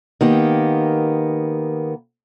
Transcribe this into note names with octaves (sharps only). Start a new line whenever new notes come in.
D#3 A#3 B3 G4